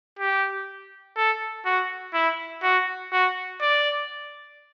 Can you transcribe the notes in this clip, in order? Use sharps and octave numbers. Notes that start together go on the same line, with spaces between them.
G4
A4
F#4
E4
F#4
F#4
D5